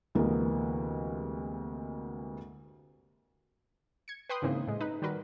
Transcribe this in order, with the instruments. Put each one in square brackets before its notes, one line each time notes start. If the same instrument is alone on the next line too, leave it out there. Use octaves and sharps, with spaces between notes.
[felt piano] D2 C3 E3 G#3 A#3 B3
[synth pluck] G#6 C#7
B4 G5 C6 D#6 F#6
G#2 C#3 E3 A#3 C4 D#4
A2 G#3
D#4 B4
D#3 G3 F#4 A#4 B4